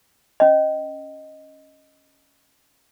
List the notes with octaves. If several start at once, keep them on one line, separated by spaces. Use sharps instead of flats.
C#4 D#5